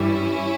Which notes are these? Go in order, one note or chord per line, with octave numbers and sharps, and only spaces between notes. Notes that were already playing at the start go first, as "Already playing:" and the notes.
Already playing: G2 E3 G3 C#4 E4